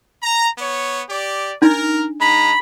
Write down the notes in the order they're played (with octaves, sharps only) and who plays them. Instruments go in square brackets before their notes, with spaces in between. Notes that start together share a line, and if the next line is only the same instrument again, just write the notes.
[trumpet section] A#5
B3 C#5
G4 D5
[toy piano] D4 D#4 [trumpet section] A#4
[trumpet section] G#3 A#5 [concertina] B5